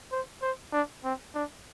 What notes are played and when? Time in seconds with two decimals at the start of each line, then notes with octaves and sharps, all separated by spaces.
0.12 C5
0.42 C5
0.73 D4
1.04 C4
1.35 D4